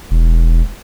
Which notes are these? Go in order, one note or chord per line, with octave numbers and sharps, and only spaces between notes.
E1